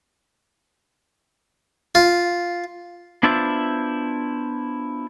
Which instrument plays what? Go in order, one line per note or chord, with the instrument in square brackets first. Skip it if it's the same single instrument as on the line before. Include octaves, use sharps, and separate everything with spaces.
[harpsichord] F4
[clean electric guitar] B3 D4 E4 F4 C5 E5